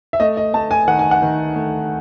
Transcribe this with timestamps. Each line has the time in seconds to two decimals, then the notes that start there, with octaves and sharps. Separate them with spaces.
0.13 E5
0.20 A3 D#5
0.37 D#5
0.54 A3 A5
0.71 G#5
0.88 D#3 F#5
0.99 G#5
1.11 F#5
1.22 D#3
1.56 A3